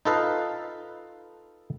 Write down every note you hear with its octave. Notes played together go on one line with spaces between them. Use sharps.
D#4 F4 A4 B4 D#5 F5